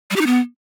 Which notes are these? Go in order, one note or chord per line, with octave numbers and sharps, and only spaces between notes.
G3
G4
D#4
B3